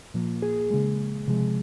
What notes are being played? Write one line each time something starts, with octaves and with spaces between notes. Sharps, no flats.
A#2 F3 A#3
G#4
C#3 G#3
C3 F3 G#3